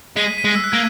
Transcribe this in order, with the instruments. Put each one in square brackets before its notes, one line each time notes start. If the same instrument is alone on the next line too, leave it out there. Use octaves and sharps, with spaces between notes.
[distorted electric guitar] G#3 [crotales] B6 D#7
[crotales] B6 D#7
[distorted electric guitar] G#3
[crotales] E6
F#6
[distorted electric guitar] A#3 [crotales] G#6